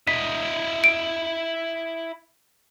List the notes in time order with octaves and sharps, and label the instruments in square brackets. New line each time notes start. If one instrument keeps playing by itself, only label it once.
[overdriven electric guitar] E4 D#5 [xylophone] B6
[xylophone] D7